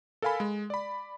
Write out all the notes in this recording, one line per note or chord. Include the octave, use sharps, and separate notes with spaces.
A4 A#4 F5 G#5 B5
G#3
D5 B5